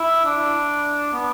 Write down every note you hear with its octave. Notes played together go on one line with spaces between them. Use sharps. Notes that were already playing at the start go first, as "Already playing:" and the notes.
Already playing: E4
D4
B3